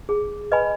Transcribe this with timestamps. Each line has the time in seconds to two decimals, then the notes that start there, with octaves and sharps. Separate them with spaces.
0.09 G#4
0.52 B4 D#5 G#5 B5